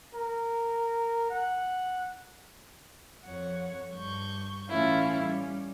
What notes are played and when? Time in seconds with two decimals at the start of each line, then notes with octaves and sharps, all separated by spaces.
0.14 A#4
1.30 F#5
3.24 F2 C#5 F#5
3.93 G2 C#6 G6
4.69 A2 E3 A3 C#4 E4 F4
5.20 G3 C#4